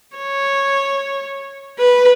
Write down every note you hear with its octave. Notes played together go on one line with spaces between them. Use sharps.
C#5
B4